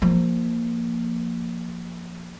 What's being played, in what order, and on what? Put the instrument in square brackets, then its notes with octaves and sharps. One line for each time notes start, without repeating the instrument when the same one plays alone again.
[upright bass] F3 A#3